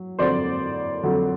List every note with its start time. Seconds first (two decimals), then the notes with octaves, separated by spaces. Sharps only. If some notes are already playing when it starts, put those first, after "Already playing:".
Already playing: F#3
0.19 F2 D3 F#3 C5 D5
1.03 F2 D3 F#3